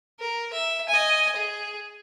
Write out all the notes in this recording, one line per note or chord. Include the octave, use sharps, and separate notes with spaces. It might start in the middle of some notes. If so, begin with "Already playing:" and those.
A#4
E5
D#5 G#5
G#4